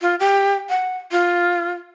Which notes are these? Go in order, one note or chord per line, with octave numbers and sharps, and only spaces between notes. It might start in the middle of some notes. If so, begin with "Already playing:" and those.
F4
G4
F#5
F4